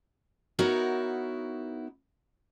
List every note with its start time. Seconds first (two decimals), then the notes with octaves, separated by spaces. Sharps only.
0.59 B3 D#4 E4 F#4 A#4 C#5